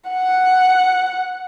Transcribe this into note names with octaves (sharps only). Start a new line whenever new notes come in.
F#5